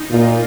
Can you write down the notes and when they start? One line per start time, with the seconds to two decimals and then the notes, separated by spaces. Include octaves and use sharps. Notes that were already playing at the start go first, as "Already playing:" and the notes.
Already playing: D#4
0.10 A#2 F4